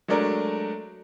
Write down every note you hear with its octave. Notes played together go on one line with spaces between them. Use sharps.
F#3 G#3 A3 D4 A#4